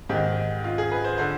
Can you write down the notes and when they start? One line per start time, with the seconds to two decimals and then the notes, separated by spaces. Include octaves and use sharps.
0.09 G#2 G4
0.14 D#3
0.64 F4
0.78 G#4
0.91 B4
1.04 C5
1.18 D3 C5